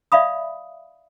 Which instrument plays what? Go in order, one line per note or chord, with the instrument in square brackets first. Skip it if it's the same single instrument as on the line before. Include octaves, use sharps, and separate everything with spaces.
[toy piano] D5 E5 F5 B5 D#6